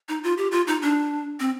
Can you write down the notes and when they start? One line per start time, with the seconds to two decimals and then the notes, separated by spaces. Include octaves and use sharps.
0.09 D#4
0.24 F4
0.38 G4
0.52 F4
0.67 D#4
0.82 D4
1.40 C4